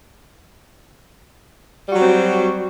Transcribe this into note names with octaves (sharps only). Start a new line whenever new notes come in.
F#3 G3 C4 F#4